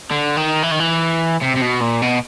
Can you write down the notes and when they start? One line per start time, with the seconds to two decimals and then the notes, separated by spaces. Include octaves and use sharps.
0.11 D3
0.37 D#3
0.63 E3
0.71 D#3
0.80 E3
1.42 C3
1.57 C3
1.62 B2
1.82 A#2
2.02 B2